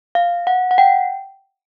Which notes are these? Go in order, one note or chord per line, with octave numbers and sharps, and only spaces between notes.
F5
F#5
F#5
G5